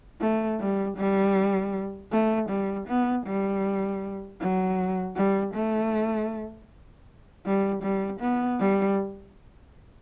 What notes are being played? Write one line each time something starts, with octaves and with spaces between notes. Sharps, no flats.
A3
G3
G3
A3
G3
B3
G3
F#3
G3
A3
G3
G3
B3
G3